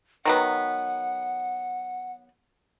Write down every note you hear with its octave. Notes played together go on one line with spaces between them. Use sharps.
D#3 F#3 B3 F#5